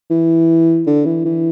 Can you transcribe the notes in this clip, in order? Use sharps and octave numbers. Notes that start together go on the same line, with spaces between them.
E3
D3
E3
E3